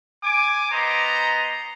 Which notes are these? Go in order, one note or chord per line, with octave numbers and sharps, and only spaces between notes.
G#5 D6
B3 C5 D#5 A#5